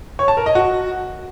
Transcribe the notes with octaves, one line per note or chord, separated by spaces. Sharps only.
C#5
A5
A#4
D#5
F#4